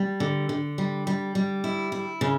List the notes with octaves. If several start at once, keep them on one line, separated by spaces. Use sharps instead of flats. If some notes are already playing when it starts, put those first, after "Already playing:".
Already playing: G3
D3
D3
G3
G3
G3
E4
E4
C#3